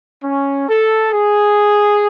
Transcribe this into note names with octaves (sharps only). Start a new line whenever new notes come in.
C#4
A4
G#4